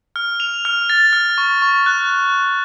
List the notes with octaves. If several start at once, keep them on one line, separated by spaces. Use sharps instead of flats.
F6
F7
F6
A6
F6
C#6
C#6
F#6
F#6